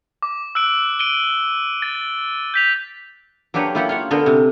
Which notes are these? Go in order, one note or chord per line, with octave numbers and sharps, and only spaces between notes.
D6
E6 F#6 D7
D7 D#7 G7
A6
G6 B6 F7
F#3 A#3 D4 G4 B4 C#5
A#3 E4 F4 G4 F#5
F4 C#5 F#5
D3 B3 A4 A#4 C5
C3